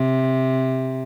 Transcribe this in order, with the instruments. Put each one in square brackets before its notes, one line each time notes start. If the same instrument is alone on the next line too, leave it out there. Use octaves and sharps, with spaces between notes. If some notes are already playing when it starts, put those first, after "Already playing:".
Already playing: [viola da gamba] C3